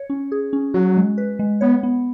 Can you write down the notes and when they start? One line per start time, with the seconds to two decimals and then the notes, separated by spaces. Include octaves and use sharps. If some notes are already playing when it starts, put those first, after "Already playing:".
Already playing: C#5
0.10 C#4
0.32 G#4
0.53 C#4
0.74 F#3 F#4
0.97 G#3
1.18 B4
1.39 G#3
1.61 B3 C#5
1.83 B3